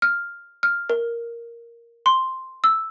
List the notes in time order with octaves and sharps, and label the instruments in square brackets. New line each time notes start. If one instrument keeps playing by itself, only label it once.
[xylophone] F6
F6
A#4
C6
E6